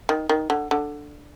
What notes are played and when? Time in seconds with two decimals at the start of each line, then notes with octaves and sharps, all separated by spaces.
0.09 D#3
0.29 D#3
0.50 D3
0.71 D3